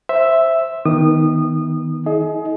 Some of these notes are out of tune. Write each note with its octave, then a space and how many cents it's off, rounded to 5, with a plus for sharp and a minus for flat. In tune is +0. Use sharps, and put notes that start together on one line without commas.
C5 +15 E5 +0
D#3 +15 B3 -5 D#6 -25
D#4 +45 G#4 +35 D#5 +15